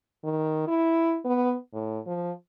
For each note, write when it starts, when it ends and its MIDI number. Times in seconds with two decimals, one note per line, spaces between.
0.24 0.64 51
0.67 1.18 64
1.25 1.56 59
1.73 1.99 45
2.06 2.31 53